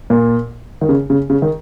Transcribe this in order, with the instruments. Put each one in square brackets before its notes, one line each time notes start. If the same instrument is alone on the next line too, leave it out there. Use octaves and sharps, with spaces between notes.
[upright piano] A#2
D#3
C#3
C#3
C#3
D#3